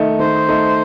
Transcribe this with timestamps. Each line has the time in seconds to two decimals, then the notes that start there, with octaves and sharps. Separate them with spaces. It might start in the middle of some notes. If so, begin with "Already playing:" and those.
Already playing: D#3 A3 D#4
0.19 D#3 C5
0.48 A3 D#4